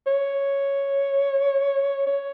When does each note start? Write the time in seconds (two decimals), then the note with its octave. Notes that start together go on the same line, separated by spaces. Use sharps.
0.07 C#5
2.07 C#5